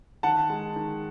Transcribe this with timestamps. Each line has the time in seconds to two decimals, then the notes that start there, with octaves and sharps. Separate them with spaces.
0.23 D#3 F#5 A5
0.50 G#3
0.76 D#3